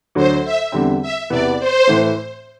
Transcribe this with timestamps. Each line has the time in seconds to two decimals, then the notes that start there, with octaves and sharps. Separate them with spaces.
0.15 D2 D3 F#3 C5
0.44 E5
0.72 E2 D3 G3 C4
1.02 E5
1.30 E2 C3 E3 B3 D5
1.59 C5
1.87 A2 E3 A3